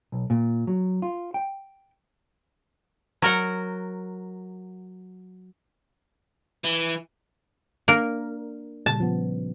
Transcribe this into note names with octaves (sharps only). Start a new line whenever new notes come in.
B1
A#2
F#3
F4
G5
F#3 A#4 F#5
E3
A#3 D4 A#4
A#2 C#3 G3 A5
F3 B3